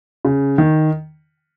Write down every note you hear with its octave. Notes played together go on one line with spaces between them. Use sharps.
C#3
D#3